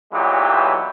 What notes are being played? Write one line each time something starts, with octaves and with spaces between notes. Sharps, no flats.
B1 A#2 E3 F#3 G#3 G4